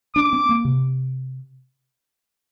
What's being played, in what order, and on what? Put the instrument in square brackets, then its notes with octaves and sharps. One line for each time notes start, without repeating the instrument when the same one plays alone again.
[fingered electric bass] D4 [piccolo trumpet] D6
[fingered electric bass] C4
A#3
C3